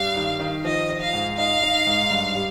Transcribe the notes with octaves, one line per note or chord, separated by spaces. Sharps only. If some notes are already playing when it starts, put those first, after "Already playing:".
Already playing: G2 G3 F5
D#3
D#3
F3 D#5
D#4
F5
G#2
D#4 F5
D#4
G#2
G2
G3